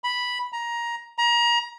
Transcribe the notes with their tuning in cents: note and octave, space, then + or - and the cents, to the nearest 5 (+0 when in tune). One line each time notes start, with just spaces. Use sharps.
B5 -5
A#5 +15
A#5 +30